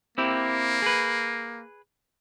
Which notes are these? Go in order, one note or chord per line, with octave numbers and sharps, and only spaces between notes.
A#3 C4 E4 G4
G#4 B4